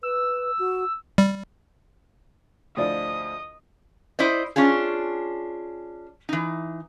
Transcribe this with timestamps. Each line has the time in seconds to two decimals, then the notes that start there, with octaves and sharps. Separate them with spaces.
0.03 B4 E6
0.59 F#4
1.18 G3
2.77 D2 F3 E4 G#4 A4 D5 D#5 D#6
4.19 E4 C5 D5 D#5
4.56 C#4 D4 F4 G#4
6.29 E3 D#4